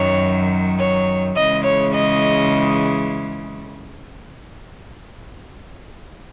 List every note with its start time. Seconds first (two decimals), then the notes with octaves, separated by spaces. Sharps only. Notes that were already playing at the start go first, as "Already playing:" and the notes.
Already playing: F#2 D#3 F#3 C#5
0.79 C#5
1.36 C#3 E3 G#3 D#5
1.64 C#5
1.93 D#5